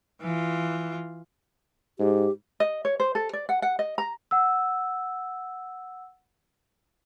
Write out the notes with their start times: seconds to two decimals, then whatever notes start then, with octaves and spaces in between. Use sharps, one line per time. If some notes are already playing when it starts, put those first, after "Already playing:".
0.22 E3 F4
1.99 G#2 G4
2.60 D#5
2.85 C#5
3.00 C5
3.15 A4
3.33 D5
3.49 F#5
3.62 F#5
3.79 D#5
3.98 A#5
4.31 F#5 E6